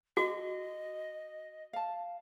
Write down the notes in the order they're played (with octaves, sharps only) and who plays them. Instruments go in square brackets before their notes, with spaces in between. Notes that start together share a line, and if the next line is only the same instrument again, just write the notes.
[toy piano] F#4 [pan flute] D#5
[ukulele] F5 A5